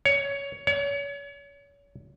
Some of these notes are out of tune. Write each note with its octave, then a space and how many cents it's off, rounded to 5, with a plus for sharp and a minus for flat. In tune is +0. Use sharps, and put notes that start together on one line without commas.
C#5 +15
C#5 +35